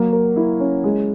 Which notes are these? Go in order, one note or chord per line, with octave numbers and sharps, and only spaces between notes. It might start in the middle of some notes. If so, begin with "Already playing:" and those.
Already playing: F#3 A#3
A#4
E4
C#4
G#3